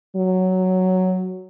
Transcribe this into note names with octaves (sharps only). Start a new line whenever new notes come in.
F#3